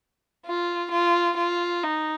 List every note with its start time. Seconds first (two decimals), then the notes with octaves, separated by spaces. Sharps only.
0.46 F4
0.91 F4
1.37 F4
1.84 D#4